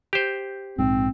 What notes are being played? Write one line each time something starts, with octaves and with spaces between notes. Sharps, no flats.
G4 C5
A#1 G#2 C4